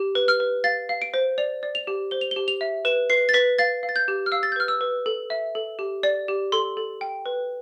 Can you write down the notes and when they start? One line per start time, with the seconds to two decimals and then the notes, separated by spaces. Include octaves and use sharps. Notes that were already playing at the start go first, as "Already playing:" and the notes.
Already playing: G4
0.15 B4
0.28 F6
0.40 B4
0.64 F5 A6
0.89 F5
1.02 D7
1.14 C5
1.38 D5 F7
1.63 D5
1.75 F7
1.87 G4
2.11 C5 G7
2.21 F7
2.31 G4 G7
2.48 F7
2.61 E5
2.85 B4 E7
3.10 B4 C7
3.29 A6
3.34 B4 B6
3.58 F5 A6
3.83 F5
3.89 A6
3.96 G6
4.08 G4
4.26 F6
4.32 F5 E6
4.43 A6
4.52 G6
4.56 B4 F6
4.68 E6
4.81 B4
5.06 A4
5.30 E5
5.55 A4
5.79 G4
6.03 D5
6.28 G4
6.52 A4 C6
6.77 A4
7.01 G5
7.26 B4